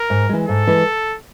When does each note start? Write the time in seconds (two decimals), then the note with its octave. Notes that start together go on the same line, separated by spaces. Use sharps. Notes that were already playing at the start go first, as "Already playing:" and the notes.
Already playing: A#4
0.10 G#2
0.29 E3 G#3
0.49 G#2 A4
0.67 E3 G#3